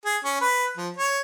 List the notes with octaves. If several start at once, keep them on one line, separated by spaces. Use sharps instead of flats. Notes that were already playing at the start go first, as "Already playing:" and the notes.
G#4
C#4
B4
F3
C#5